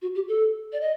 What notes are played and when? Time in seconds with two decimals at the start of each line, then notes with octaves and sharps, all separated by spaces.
0.02 F#4
0.15 G4
0.28 A4
0.73 D5
0.81 D#5